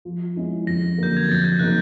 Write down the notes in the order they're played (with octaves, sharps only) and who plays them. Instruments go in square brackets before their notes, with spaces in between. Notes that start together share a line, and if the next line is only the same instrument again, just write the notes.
[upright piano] F3
G#3 C#4 E4
[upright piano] F2 [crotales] A#6
[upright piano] D3 F#3 A#3 [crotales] G6
[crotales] G#6
[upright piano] F2 [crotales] A6
[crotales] G6
[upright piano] C#3 F#3 A#3 D#4 [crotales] F#6